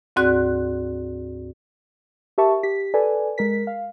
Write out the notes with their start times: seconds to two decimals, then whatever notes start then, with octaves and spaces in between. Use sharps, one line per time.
0.16 D2 G#2 C4 F#4 D5 F#6
2.38 G4 A#4 E5 A5 C#6
2.63 G4 B6
2.94 A4 B4 D5 G#5
3.38 G#3 A#4 B6
3.67 F5